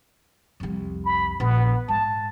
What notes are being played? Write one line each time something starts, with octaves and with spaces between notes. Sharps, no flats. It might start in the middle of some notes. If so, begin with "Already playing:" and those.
C2 F2
B5
A#1 B3
G#2 A5